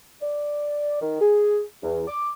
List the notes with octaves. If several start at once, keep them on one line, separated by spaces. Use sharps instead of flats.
D5
D#3
G#4
E2
D6